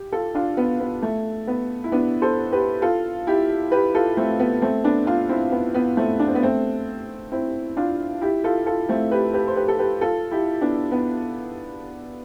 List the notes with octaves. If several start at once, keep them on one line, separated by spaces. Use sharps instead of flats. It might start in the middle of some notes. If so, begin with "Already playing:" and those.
Already playing: G4
F4 A4
D4 F4
B3
B3
A3
B3
E4
B3 D4
A4 C5
G4 B4
F4 A4
E4 G4
G4 B4
F4 A4
A3 C4
B3
A3 C4
B3 D4
D4 F4
C4 E4
B3
B3
A3 C4
D4
C4
B3
A3 C4
C4 E4
D4 F4
E4 G4
F4 A4
F4 A4
A3 C4
G4 B4
G4 B4
C5
G4 B4
A4
G4 B4
F4 A4
E4 G4
B3 D4
B3